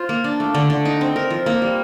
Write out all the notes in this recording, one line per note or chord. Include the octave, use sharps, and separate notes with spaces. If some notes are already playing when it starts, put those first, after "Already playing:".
Already playing: F4 C5
A#3
D4
A3
D3
D3
D#4
C4
A#4
F3
A#3
G3